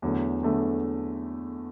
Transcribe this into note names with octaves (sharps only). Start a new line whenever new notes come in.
E2 D3 F#3 A3
E2 D3 F#3 A3